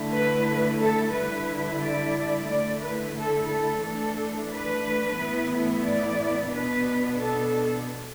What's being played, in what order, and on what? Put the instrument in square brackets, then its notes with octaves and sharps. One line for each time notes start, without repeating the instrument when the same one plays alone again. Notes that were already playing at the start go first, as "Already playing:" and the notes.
Already playing: [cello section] D3 A3 E4
B4
A4
D3 G3 E4 B4
D5
D3 A3 E4 D5
B4
A4
A4
E3 A3 D4 A4
B4
A2 E3 B3 E4
D5
B2 B3 D4 B4
A4